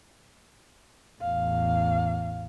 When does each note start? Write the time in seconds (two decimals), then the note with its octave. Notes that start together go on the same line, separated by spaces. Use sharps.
1.21 A1 E2 F5